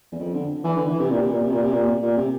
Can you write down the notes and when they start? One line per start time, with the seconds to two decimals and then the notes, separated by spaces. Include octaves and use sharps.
0.12 E2
0.19 F2
0.34 D3
0.64 E3
0.76 D3
0.87 E3
0.99 C3
1.10 A#2
1.20 C3
1.31 A#2
1.41 C3
1.51 A#2
1.61 C3
1.72 A#2
2.02 A#2
2.17 C3